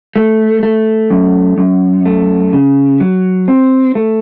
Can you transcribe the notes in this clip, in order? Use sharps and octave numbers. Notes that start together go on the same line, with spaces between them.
A3
A3
F#2
F#2
A3
C#3
F#3
C4
A3